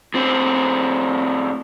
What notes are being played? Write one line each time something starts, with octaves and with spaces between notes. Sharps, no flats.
A2 C4